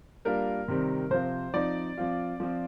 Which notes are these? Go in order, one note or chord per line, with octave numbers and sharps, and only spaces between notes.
G3 A#3 D4 F4 A#4
C3 D#3 G3 C4
C3 F3 C4 F4 C5
F3 C4 D#4 D5
F3 C4 F4
F3 C4 F4